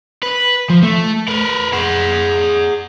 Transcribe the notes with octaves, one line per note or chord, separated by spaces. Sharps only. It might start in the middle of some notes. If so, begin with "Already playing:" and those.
B4
F3
A3
A#4 B4
G#4 F#5